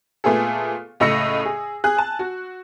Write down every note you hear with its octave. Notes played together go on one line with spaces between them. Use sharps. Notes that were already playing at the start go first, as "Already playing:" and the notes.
A#2 A3 B3 G#4 A4
C#2 A2 D#5 E6 A#6 C#7
G#4
G#4 G#5 F#6
G#5 A5
F#4